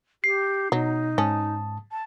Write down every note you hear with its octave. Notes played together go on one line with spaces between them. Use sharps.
G4 C7
B2 F#3 D#4
G#2 C#4 A5 D#6
A5